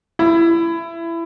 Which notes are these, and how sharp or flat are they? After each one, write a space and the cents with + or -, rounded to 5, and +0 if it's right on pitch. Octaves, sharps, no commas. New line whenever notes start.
E4 +20